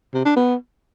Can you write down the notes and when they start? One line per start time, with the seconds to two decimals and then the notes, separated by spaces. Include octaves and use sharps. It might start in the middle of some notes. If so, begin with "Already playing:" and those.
0.14 C3
0.25 D4
0.36 B3